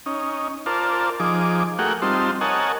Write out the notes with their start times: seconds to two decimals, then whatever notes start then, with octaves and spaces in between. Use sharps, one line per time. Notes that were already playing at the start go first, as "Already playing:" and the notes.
0.06 C#4 D#4
0.66 F4 A#4 C5 D5 A5
1.20 F3 D#4 G#4 D6
1.79 A3 F#4 G#4 A#4 F#5 G5
2.02 G3 C4 D#4 F4 A5 C6
2.41 A#4 C#5 D#5 F#5 G#5 A5